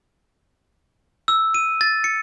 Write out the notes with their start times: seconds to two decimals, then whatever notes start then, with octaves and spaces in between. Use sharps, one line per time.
1.28 E6
1.54 D#7
1.81 A6
2.04 C#7